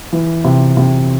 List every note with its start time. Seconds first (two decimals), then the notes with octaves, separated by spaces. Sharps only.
0.13 E3
0.44 C3
0.77 C3